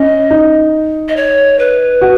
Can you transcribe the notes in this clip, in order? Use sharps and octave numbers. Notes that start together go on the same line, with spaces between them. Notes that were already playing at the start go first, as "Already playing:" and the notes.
Already playing: C#4 D#5
D#4
D#5
C#5
B4
F#4